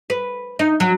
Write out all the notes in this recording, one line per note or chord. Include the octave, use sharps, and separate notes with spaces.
B4
D#4
F#3